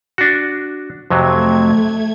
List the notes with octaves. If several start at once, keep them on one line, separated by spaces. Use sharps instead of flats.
D4 F#4
F2 C3 F#3 A3 G#6